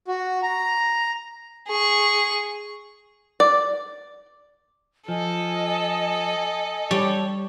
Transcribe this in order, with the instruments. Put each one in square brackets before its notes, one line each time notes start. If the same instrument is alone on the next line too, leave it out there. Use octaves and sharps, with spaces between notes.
[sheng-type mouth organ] F#4
A#5
[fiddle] G#4 C#6
[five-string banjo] D5
[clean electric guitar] F3 [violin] A4 [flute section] D#5 G#5
[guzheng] G3 [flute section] G4 A5 [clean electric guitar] C#5